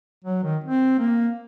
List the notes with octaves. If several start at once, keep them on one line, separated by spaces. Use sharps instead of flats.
F#3
D#3
C4
A#3